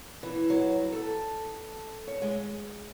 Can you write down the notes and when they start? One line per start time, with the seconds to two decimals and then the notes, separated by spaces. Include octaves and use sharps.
0.23 E3
0.50 F#3
0.92 A4
2.07 C#5
2.22 G#3